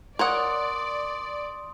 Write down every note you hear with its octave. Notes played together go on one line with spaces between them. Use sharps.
A#4 C#5 D5 F#5 C6 D#6